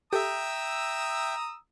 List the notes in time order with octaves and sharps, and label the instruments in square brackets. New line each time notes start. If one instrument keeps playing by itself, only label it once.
[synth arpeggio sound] G4 A4 [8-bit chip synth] E5 G5 [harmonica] A#5 D#6 E6